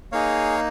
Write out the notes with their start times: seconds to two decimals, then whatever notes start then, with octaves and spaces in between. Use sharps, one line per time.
0.12 A#3 D#4 G#4 C#5 F5